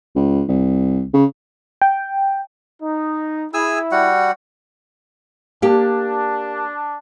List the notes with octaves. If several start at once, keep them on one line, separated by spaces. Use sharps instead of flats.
C#2
C2
C#3
G5
D#4
E4 G#4 G#5 E6
G3 F#4 F#5
A#3 D4 G4